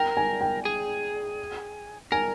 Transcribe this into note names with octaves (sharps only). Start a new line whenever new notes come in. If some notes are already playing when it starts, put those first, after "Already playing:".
Already playing: A#4 G5
G#5
G5
G#4
A#4 G#5